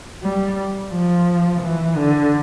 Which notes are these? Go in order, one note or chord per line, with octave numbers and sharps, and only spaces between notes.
G3
F3
E3
D3